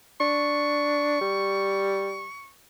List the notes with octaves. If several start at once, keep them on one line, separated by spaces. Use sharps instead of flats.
D4 C#6
G3